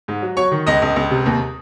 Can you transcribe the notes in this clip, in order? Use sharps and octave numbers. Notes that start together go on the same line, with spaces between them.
G#2
F#3
F#3 C#5 C#6
D#3
C#2 D#5 D#6
C#2
C#2
C3
D#2